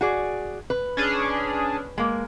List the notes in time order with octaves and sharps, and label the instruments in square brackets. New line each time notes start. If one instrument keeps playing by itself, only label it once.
[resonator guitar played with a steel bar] F#4 G#4 D5
B4
[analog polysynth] C#4 D4 G#4
[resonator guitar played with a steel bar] G#3 A#3